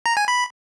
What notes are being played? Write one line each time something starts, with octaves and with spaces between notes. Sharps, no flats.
A#5
G#5
B5